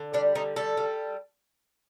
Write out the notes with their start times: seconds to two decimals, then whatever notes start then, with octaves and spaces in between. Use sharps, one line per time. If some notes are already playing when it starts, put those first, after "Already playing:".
Already playing: D3
0.14 G3 D4
0.35 D3 D#4
0.56 G3 A4
0.77 G3